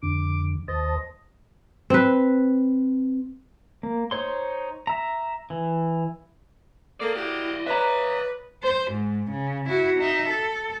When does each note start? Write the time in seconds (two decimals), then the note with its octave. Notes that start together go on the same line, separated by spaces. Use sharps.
0.03 F2 D3 D6
0.68 D#2 C5 D#5 A5
1.90 C4 B4
3.83 A#3
4.11 D#4 C5 C#5 C6
4.87 E5 A#5
5.50 E3
7.00 A#3 A4 D5 D#5
7.16 A#3 E4 F#4 G4
7.66 B4 C#5 E5 A#5
8.62 C5
8.92 G#2
9.31 C#3
9.69 E4 F#4
9.99 D#4 E5
10.29 A4